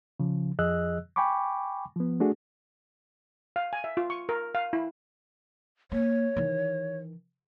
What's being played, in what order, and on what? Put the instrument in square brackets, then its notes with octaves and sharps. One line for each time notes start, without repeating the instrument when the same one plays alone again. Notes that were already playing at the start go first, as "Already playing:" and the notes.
[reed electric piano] C#3 F3
F2 F3 G#4 D#5 E6 F#6
G5 G#5 B5 C#6 D6
F3 B3
A3 D4 F#4 G#4
[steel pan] F5
G#5
E5
F4
C#6
A#4
F5
E4
[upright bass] A#3 [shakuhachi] C#5
[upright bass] D#3 E3